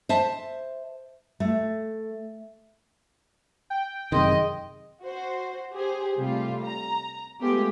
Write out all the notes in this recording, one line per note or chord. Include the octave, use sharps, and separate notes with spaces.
C5 E5 A5
A3
G5
F#2 C3 D#3 G#4 D#5 C6
F#4 C5
G4 G#4 C5
C3 G3 A3 F4
A#5
G#3 A3 B3 F4 G4 G#4